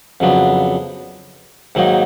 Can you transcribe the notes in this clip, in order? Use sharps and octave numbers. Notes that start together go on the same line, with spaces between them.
F2 C#3 F#3 B3 D4
G#2 D#3 F#3 A#3 D#4